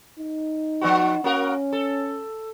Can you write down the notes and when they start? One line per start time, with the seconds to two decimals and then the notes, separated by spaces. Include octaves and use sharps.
0.18 D#4
0.81 F3 B3 F#4
1.24 A#3 C#4 F#4 A#4
1.73 A4